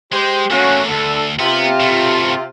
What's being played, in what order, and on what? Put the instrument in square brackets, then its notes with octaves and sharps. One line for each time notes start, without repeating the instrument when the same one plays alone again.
[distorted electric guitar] G#3 [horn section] G4 C5
[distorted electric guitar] A3 A#3 [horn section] C#4 F#4
[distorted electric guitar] D2 [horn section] D3 A4
[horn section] C3 F4 [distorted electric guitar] B3
[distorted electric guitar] B2 A3